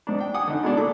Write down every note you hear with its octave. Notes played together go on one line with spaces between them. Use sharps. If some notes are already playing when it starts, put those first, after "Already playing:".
G#2 D4
G5
F#5 G#5 D6 D#6
D3 D#4
B2 G#3 D4
A#2 A4 D6